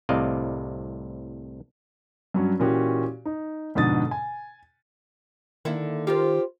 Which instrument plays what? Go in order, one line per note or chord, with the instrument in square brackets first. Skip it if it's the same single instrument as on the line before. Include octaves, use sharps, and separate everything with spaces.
[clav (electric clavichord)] C2 A2 C3 D5 D#5 F5
[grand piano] G2 F#3 C#4 F#4
A#2 E3 C#4 F#4 G4
D#4
F2 G#2 B2 D3 D#6 A6
G#5
[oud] D3 A#3 E4 [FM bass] D#3
[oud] F4 A#4 C5 [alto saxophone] G4